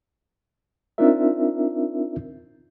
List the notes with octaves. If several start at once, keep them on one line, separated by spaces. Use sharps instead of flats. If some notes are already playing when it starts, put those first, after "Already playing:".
C4 D4 D#4 F4 A#4 E5